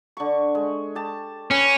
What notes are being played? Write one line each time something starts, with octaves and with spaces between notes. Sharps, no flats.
D3 C#6
G#3
G4 A5
C#4 B4